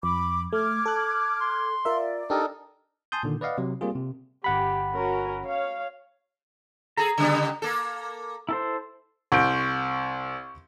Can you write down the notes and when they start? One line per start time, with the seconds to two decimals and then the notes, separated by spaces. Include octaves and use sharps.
0.03 F2 B5 D6
0.53 A3 D6 F6 G#6
0.86 A4 F#6
1.41 C6
1.85 F4 A#4 D5 E5
2.30 D4 D#4 G4 A4 A#4
3.12 G#5 A5 C6 D#6 G6
3.23 A#2 D3 D#3
3.41 B4 D5 D#5 F5 F#5
3.58 C3 F#3
3.81 G3 A#3 C4 F4 G#4
3.95 C3
4.44 G1 G4 F#5 B5
4.94 C#4 F#4 A#4
5.46 C#5 F5
6.97 G#4 A4 A#5
7.18 C#3 G3 B3
7.62 A#3 A4
8.49 E4 A4 C5
9.32 C2 C#6 G6 D7